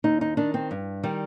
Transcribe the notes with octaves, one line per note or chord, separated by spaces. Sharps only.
D#2 D#4
D#4
D#3 D4
C4
G2
D#3 G3